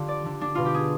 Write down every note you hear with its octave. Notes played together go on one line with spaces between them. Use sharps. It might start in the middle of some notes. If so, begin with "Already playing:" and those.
Already playing: D3 F4 G4
D5
D3
D4
B2 F4
G4
G#4